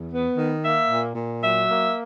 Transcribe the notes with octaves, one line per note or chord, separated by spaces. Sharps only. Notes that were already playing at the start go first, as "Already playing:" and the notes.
Already playing: E2
B3
D#3
A#3 E5
A#2
A#2
F#3 E5
A#3